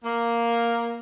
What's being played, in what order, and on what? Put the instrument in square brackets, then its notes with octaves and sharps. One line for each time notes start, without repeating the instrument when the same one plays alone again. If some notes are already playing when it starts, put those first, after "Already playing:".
[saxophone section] A#3